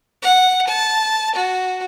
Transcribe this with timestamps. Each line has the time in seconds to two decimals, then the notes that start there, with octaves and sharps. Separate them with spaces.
0.22 F#5
0.67 A5
1.35 F#4